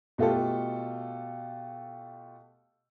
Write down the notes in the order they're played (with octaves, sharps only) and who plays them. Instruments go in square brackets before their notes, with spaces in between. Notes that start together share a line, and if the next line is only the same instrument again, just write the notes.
[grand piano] B2 A3 F4 G4 A4